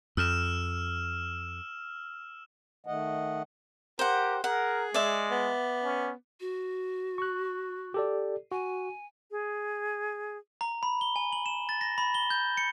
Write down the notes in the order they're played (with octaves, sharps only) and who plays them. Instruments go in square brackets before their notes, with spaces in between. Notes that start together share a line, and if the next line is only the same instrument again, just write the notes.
[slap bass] F2 [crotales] E6 F6 E7
[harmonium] D#3 A3 D#5 F#5
[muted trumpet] G4 [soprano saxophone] A#4 [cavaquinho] C5 F#5
[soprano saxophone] G#4 [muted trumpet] A#4 [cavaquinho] F#5
[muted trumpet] G#3 [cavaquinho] D5 E5
[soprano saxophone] B3
[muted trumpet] C#4
[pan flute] F#4
[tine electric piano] C#6 F#6
G4 A4 D5
[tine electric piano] F#4 [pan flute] G#5
[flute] G#4
[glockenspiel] A#5
B5
G7
G#5
F#7
E7
A6
A#6
B5
G7
G6
C#7